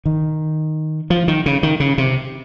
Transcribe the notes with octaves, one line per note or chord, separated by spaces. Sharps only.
D#3
F3
D#3
C#3
D#3
C#3
C3